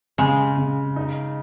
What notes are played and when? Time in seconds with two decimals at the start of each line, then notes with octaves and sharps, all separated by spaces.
0.18 C#3 G#3
0.57 C#3
0.96 D#4